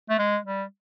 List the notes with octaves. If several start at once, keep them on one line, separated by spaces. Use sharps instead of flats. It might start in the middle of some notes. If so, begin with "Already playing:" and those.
A3
G#3
G3